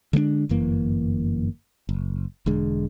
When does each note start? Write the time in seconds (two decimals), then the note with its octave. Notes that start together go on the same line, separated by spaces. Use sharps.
0.13 D3 G#3 A#3 D4
0.49 G1 F#2 E3 A#3
1.89 F#1
2.46 E1 D3 G#3